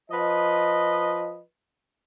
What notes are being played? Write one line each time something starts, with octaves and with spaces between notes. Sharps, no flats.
F3 B4 D#5